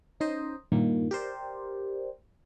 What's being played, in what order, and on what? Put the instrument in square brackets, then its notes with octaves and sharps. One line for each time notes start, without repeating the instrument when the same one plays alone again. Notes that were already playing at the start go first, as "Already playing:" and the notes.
[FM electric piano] C#4 D#4 C5 D#5
G2 A#2 D#3 A#3
G4 A#4 C5 D5